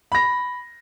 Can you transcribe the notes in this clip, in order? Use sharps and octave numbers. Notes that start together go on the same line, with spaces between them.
B5 A#6